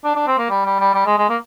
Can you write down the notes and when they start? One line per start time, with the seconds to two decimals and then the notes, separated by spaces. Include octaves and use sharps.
0.04 D4
0.15 D4
0.27 C4
0.38 A#3
0.50 G3
0.65 G3
0.80 G3
0.94 G3
1.06 G#3
1.18 G#3
1.29 A#3